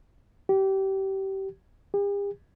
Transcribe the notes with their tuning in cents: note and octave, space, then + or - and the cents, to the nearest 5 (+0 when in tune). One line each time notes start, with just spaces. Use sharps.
G4 -25
G4 +45